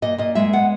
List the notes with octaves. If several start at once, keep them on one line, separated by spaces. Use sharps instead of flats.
A#2 D#5
A#2 D#5
G#3 E5
B3 F#5